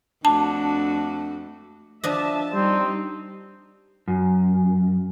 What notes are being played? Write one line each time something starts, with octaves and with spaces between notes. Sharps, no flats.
F2 A3 D4 F#4 A5
F3 D4 D#5 E5 A5
G3 C4 D#4
F#2